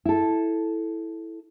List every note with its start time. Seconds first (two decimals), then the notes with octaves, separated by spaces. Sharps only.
0.05 E4 A4